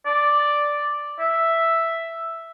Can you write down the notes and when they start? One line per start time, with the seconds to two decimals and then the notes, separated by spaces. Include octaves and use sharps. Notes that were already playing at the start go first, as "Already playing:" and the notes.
0.06 D5
1.19 E5